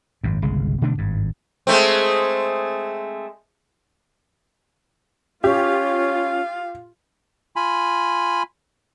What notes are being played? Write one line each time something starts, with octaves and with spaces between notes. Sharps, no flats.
G#1 F#2
G1 C2 C#3 G#3
B2 D3 A3 D4
G#1 G2
G#3 A3 C4
C#4 F4 G4 F5
F4 G#5 B5